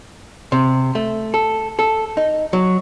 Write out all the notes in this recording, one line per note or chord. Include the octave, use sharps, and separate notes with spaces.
C3
A3
A4
A4
D#4
F#3